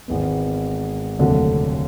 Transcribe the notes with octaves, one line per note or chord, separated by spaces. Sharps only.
G#1 G#2 E3 G#3 B3
F1 D#2 D3 F#3 A3